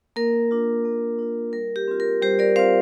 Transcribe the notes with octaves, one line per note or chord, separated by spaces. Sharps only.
A#3 A#4
D4 F4
A#3
D4 F4
G3 A#4
G4
C4 F4
A#4
G3 G4 C5
A#4 D5
C4 F4 C5 F5